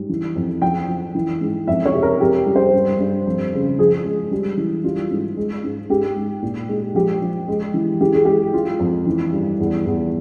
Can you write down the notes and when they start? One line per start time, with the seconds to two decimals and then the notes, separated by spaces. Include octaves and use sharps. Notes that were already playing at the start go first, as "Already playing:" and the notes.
Already playing: G#2 G3
0.09 E3
0.36 F2
0.62 F3 G5
0.88 F3
1.15 E3
1.41 G#2
1.68 F2 E5
1.85 C#5
1.94 C3
2.03 A#4
2.20 F2 G4
2.46 G3
2.56 C5
2.73 G2
2.99 G2
3.26 F2
3.53 C#3
3.79 F3 G#4
4.04 G#3
4.31 G3
4.57 E3
4.84 G3 F4
5.11 G#2
5.37 G#3
5.64 G#2
5.90 G#2 G4
6.16 G#2
6.42 A#2
6.69 G#3
6.95 F3 G4
7.22 F3
7.48 G#3
7.74 E3
8.01 E3 G4
8.14 G#4
8.25 G#3 G4
8.53 G#3 F4
8.79 F2
9.06 E3
9.32 G2
9.60 E2
9.86 E2